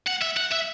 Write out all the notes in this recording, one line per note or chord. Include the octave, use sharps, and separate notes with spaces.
F#5
E5
F#5
E5